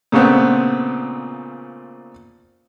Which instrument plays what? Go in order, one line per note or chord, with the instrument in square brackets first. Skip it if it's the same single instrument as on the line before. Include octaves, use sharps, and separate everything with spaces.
[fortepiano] A#2 C#3 A3 B3 C4